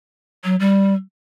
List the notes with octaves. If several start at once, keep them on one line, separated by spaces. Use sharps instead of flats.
F#3
G3